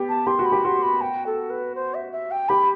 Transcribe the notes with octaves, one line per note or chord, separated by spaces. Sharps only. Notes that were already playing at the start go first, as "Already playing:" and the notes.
Already playing: B3 G4
A5
G4 C6
F#4
B5
G4
F#4 C6
B5
G5
A4
B4
C5
E5
E5
G5
G4 B5